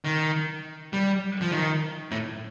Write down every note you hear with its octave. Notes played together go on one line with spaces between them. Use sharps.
D#3
G3
F3
D#3
A2